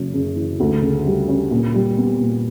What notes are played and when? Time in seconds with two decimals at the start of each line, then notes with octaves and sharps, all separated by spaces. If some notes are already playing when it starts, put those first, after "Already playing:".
Already playing: F#1 F#2
0.14 C#3
0.36 E3
0.60 D2
0.82 C#3
1.06 G3
1.28 C#4
1.51 A#2
1.74 G3
1.97 B3
2.20 A#2